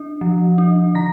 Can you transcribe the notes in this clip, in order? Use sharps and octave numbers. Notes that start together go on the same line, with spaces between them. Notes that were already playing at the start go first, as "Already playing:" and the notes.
Already playing: D4 D#5
F3
D4
D3 A#5 A#6